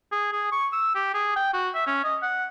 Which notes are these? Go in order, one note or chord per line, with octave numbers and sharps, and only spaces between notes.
G#4
G#4
C#6
E6
G4
G#4
G5
F#4
E5
C#4
D#5
F#5